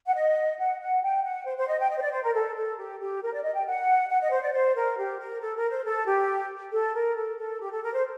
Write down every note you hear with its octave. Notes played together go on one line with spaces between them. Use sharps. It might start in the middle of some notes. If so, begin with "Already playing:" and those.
F#5
D#5
F#5
F#5
G5
F#5
C5
C5
D#5
G5
D#5
C5
D5
C5
A#4
A4
A4
G4
G4
A#4
D5
D#5
G5
F#5
F#5
D#5
C5
D5
C5
A#4
G4
A#4
A4
A#4
C5
A4
G4
A4
A#4
A4
A4
G4
A4
A#4
C5